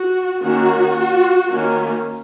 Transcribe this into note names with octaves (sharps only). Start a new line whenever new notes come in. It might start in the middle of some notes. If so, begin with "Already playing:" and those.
Already playing: F#4
D#3 A#3 C#4 F#4
D#3 A#3 C#4